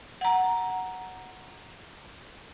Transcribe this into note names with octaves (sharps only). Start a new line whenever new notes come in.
F#5 A#5